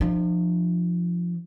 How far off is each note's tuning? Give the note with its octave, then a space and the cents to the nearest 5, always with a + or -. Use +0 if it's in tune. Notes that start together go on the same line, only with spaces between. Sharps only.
F3 +0 D4 +45